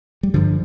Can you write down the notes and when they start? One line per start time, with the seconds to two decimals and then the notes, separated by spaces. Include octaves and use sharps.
0.23 G3
0.34 G2 D3 F3